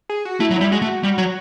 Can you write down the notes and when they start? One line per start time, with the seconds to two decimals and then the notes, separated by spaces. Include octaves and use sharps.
0.09 G#4
0.25 F#4
0.40 A3 E4
0.50 F#3
0.56 E4
0.61 G3
0.71 G#3 F#4
0.82 A3
1.03 G3
1.18 F#3